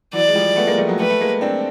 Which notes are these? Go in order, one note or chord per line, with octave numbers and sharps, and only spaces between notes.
E3 F#3 D5
G#3
F3 G3
A3 B3
G#3 A#3
G3 A3
F#3 G#3
G3 A3 B4
A3
G#3 A#3
C4 D4